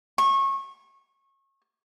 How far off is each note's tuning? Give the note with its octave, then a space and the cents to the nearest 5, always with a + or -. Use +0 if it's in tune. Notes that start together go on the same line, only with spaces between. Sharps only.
C#6 -25